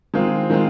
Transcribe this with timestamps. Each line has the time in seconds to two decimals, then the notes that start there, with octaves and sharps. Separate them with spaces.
0.14 D#3 G#3 C4 F4
0.50 D#3 G#3 C4 F4